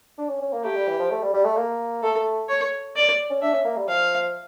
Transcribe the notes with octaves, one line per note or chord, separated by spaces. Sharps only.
D4
C#4
C#4
A#3
A3 G4
G3
E3
F3
A3
G3
G3
A3
A#3
A3 A4
C#5
D5
C#4
D4 E5
C#4
A#3
G3
F3 F5